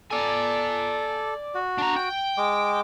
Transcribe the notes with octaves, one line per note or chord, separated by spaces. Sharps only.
A4 D5 G#5
F#4
D4 A#5
G5
G#3 D6